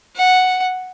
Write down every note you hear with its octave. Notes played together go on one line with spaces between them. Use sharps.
F#5